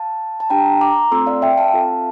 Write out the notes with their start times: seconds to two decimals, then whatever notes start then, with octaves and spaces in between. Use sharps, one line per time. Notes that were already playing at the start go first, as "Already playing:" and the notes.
Already playing: F5 A5
0.40 A5
0.50 D4 G4 G5 A#5
0.81 A#5 D6
1.11 A3 C4 F4 A4 C6 E6
1.26 D5 F5
1.42 E5 G5
1.57 F5 A5
1.73 C4 F4 A4